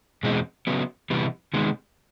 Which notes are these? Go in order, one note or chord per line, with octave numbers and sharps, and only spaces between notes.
E2 B2 G#3 C4
C#3 F#3 B3
C3 E3 G3 B3
C3 D#3 G#3 B3